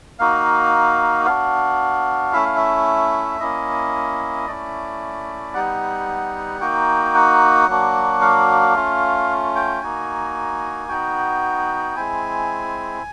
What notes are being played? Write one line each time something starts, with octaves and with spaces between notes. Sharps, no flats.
A#3 D#4 F#4 F5
B3 D4 F#4 F5
A3 C#4 E4 E5
F5
E5
A#3 C#4 E4 D#5
A3 C#4 E4 D5
G3 B3 D#4 F#5
A#3 D#4 F#4 G5
F#5
F#3 A#3 D4 F#4
F5
A3 C#4 F4
G5
A#3 D#4 F#4 G#5
B3 D#4 F#4 G5
G#3 C4 E4 G#5